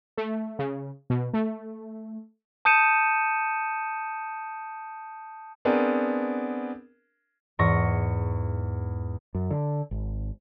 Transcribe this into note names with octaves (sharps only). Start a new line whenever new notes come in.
A3
C#3
B2
A3
A5 D#6 G6 C#7 D#7 E7
B3 C4 D4 G#4 A#4
E2 G#2 C#6 A#6
F#2
D3
G#1